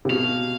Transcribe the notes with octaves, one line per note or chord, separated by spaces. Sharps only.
C3
B2 F5